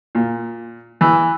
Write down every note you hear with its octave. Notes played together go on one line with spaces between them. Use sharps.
A#2
E3